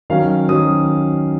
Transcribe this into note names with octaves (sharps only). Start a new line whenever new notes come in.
D#3 F#3 C#4 F5
D#3 F#3 C#4 D#6